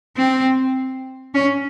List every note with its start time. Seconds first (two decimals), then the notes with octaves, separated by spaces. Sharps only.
0.17 C4
1.34 C#4